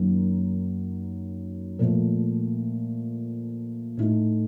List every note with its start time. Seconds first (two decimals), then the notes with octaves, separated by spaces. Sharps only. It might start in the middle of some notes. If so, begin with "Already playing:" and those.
Already playing: F#2 D#3 F#3 A#3
1.79 A#2 F3 A3
3.97 A2 A3 D#4